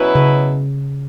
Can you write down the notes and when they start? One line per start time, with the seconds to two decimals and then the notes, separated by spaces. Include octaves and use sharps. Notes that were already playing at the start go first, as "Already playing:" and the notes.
Already playing: B2 F#3 C#4 E4 B4
0.15 C#3